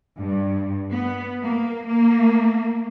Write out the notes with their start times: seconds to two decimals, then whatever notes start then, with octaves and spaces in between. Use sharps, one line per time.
0.19 G2
0.92 B3
1.44 A#3
1.87 A#3